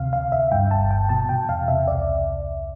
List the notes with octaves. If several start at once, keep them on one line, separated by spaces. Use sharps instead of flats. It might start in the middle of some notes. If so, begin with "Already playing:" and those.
Already playing: D2 C3 F5
D2 F5
D2 E5
G2 G5
G1 A5
G1 G5
B2 A5
B2 G5
E2 F5
C3 E5
C2 D5